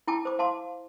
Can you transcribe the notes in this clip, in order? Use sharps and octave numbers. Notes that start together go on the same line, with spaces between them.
E4 G5 A5 D6
C5 D6
F5 A5 C6 D6